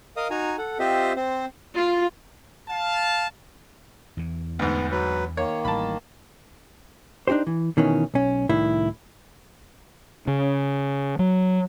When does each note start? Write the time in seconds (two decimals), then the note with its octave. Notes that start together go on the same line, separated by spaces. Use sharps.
0.17 A#4 D#5 F5 D#6
0.30 D#4 F#4 G#5 A#5
0.58 A4 F#5
0.79 C4 F4 G4 C5 D#5 E5
1.16 C4 C5
1.76 F4
2.69 F5 A5
4.17 E2 E3
4.59 D2 G#2 B3
4.91 F#3 B4
5.37 D#3 A#3 C#5
5.65 A1 A2 G3 A5 B5
7.28 D4 D#4 F#4 G4 C5
7.47 E3
7.77 B2 D#3 E3 C#4
8.14 B1 C#4
8.49 C2 A2 D#3 E4
10.27 C#3
11.19 F#3